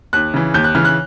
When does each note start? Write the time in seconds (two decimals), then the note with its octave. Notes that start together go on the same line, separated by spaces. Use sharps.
0.13 D#2 F#6
0.34 C#3 E3
0.54 D#2 G6
0.64 F#6
0.75 C#3 E3 F6
0.85 F#6